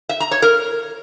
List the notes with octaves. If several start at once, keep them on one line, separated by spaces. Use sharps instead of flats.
E5
A#5
C#5
A#4